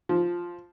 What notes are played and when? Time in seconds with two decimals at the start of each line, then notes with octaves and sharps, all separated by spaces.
0.09 F3